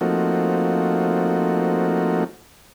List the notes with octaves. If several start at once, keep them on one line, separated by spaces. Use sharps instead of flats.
F3 A3 A#3 C4 D#4 F#4